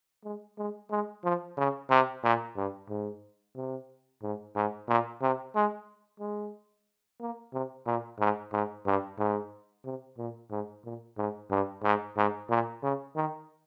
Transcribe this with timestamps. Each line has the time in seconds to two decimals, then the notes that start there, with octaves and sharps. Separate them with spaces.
0.24 G#3
0.58 G#3
0.90 G#3
1.24 F3
1.58 C#3
1.90 C3
2.23 A#2
2.57 G2
2.90 G#2
3.56 C3
4.23 G#2
4.56 G#2
4.88 A#2
5.22 C3
5.55 G#3
6.20 G#3
7.21 A#3
7.53 C3
7.86 A#2
8.19 G#2
8.52 G#2
8.86 G2
9.18 G#2
9.85 C3
10.18 A#2
10.51 G#2
10.85 A#2
11.17 G#2
11.51 G2
11.83 G#2
12.17 G#2
12.50 A#2
12.83 C#3
13.16 D#3